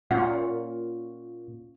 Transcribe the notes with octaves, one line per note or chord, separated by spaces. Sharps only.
A#2 C#4 F4 F#5